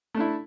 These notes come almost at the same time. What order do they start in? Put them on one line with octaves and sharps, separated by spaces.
A3 D4 E4